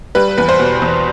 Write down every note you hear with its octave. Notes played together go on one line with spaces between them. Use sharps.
G3 B4
E2 B4
C5
B2
E2